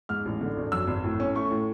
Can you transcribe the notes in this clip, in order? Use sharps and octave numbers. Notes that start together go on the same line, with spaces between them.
G#2 F6
A1
D3
G#1
F#2 E6
G#1
A2
C#4
A3 C#6
A2